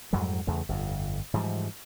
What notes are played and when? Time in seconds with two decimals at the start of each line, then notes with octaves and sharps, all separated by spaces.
0.13 F2 G#2 F#3 G3
0.47 E2 C#3 A3
0.69 G1 F2
1.34 G#2 E3 F3 G3